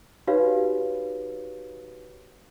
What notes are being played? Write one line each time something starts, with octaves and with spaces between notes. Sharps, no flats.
D#4 F#4 G4 B4 C#5 F5